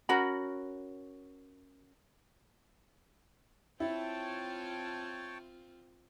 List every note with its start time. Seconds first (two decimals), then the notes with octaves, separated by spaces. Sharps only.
0.09 C#4 F#4 A#4 B5
3.80 C4 E4 F4 C#5 G5 A5